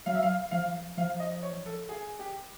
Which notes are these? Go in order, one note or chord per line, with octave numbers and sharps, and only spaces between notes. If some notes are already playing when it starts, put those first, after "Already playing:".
F#3 F5
E5
F5
F3 F5
F3 F5
D#5
C#5
A4
G#4
G4